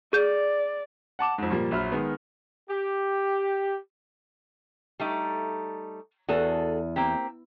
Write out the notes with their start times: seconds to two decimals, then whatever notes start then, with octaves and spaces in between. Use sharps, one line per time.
0.13 G#4 D5 G6
1.19 F#5 A5 D6 E7
1.38 F2 G#2
1.50 A#2 F3 G3 A#3
1.71 A#1 F#3 E5 B5 F6
1.92 D#3 G#3 B3
2.69 G4
4.99 G3 A3 D#4
6.28 E2 F#4 G#4 A4
6.96 A#3 C4 G4